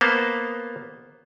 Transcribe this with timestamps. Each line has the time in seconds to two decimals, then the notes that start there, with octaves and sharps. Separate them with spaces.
0.01 A#3 B3 C5 A5